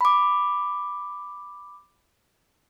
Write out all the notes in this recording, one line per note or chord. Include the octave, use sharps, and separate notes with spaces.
B5 D6